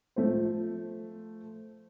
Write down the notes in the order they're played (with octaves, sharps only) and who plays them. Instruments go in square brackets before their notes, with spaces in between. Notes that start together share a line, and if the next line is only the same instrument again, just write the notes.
[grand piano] F3 A3 C5